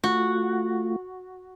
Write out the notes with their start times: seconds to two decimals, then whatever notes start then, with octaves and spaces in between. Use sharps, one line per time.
0.04 A3 F4 F#4